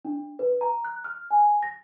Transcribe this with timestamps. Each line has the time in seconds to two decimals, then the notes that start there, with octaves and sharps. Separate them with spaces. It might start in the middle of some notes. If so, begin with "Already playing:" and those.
0.05 D4
0.39 B4
0.61 A#5
0.85 F#6
1.04 F6
1.31 G#5
1.63 A#6